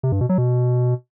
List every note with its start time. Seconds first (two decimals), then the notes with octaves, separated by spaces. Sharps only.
0.03 C3
0.12 G2
0.21 B2
0.29 F#3
0.38 B2